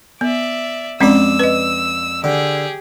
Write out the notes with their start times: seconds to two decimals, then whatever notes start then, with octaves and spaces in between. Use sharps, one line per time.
0.21 B3 D5 E5
1.01 F2 G#3 C4 C#4 D5 E6
1.39 B4 D#5
2.24 D3 G4 G#4